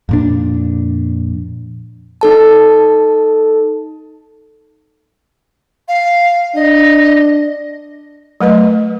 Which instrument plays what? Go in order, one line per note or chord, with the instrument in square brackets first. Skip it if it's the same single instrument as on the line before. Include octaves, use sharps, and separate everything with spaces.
[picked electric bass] F2 A#2 D4
[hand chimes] D#4 A4 A5
[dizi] F5
[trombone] D4 [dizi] D#5
[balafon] F#3 A3 B4 D#5